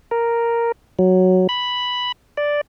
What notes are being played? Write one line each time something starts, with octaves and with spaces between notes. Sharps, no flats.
A#4
F#3
B5
D5